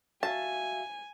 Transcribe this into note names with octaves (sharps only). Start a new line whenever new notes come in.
F#4 E5 F5 G#5 A5